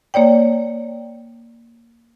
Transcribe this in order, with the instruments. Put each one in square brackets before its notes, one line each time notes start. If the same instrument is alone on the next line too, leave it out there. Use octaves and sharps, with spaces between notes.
[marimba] A#3 C#5 D5 G5